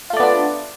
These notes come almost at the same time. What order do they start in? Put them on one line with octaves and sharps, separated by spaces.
F4 A3 D5 B3 D4